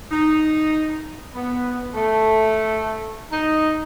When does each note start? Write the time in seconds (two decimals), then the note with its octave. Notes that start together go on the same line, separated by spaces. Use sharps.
0.11 D#4
1.35 B3
1.94 A3
3.32 D#4